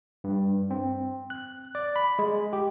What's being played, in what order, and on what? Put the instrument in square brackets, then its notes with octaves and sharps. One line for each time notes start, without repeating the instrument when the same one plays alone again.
[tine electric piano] G2
C4
F#6
D5
B5
G#3
G4